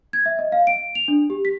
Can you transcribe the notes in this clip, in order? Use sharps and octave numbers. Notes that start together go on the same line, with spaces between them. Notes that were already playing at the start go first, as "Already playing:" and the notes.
G#6
E5
D#5
F5
D7
F7
D4
G4
B6